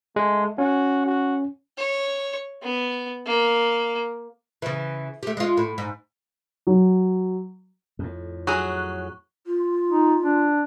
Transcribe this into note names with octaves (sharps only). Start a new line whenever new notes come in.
G#3 A3
C#4 F#4
F#4
C#5
B3
A#3
C#3 E3
A3 G4
G#3 F4
A2
G#2
F#3
F2 A2
F#3 G#4 C#6 F#6
F4
D#4
D4